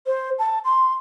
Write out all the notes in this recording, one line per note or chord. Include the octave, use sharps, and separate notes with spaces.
C5
A5
C6